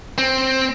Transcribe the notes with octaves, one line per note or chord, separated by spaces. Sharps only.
C4